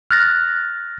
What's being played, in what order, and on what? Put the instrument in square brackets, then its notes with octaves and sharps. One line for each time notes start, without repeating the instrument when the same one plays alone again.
[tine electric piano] F6 F#6 A6 A#6